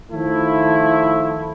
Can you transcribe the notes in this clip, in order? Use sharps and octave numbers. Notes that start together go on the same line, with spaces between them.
D#3 F3 A3 E4